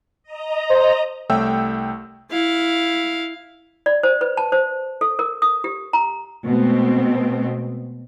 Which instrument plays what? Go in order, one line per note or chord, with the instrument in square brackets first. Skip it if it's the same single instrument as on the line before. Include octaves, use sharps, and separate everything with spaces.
[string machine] D#5 A#5
[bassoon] C5
[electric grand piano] C2 A3 C#5 E5 G5 E6
[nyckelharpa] E4 F5
[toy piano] D5
C5
B4
A5
C5
A4
A#4
D#6
G4
A#5
[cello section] B2 G#3 A3 C4